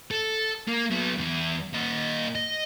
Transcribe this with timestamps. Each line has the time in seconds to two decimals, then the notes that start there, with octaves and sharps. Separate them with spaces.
0.11 A4
0.68 A#3
0.91 F#3 B3
1.18 E2 E3
1.73 A#2 D#5
2.35 D#5